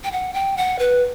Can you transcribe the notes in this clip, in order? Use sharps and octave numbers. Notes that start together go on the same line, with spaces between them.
G5
F#5
G5
F#5
B4